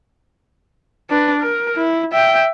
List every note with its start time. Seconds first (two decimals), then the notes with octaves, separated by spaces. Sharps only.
1.10 D4 B4
1.41 A#4
1.76 E4
2.13 E5 G5